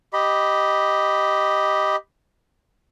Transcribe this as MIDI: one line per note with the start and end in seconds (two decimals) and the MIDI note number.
0.13 1.96 67
0.13 1.96 75
0.13 1.96 83